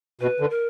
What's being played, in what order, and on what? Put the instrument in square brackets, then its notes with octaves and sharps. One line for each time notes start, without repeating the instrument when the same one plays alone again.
[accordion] B2 [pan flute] B4
[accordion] D3
[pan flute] A#4